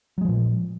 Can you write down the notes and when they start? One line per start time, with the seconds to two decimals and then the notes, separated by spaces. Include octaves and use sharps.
0.18 F#3
0.21 G#3
0.25 F3
0.28 A#2